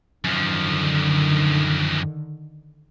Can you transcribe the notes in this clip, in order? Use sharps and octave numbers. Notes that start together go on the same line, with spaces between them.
F#2 D3 D#3 F3